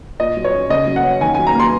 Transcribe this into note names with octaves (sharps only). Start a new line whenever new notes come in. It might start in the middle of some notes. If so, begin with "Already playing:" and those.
A#2 D#5
F#3
C#5
C#4
C#3 D#5
F#3
F#5
C#4
D#3 G#5
G#5
F#3
A#5
A#3 C6